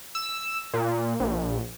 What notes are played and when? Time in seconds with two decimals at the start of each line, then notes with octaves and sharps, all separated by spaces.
0.15 E6
0.74 A#2
1.20 A#1